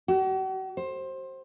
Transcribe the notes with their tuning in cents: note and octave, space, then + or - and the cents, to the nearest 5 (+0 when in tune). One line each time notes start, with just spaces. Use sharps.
F#4 +45
C5 +20